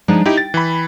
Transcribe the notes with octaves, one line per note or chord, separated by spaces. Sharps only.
F3 G#3 D4 D#4
D#4 E4 G4 G5
A6
E3 B5